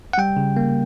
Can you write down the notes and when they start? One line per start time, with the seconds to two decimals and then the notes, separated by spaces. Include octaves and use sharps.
0.13 F#5
0.18 G3 G5
0.37 C#3
0.57 A#3